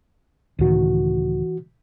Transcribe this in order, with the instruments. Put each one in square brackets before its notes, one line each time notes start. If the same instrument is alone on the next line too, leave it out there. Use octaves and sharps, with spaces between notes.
[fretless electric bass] C#2 A2 D#3 [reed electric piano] E3 F#4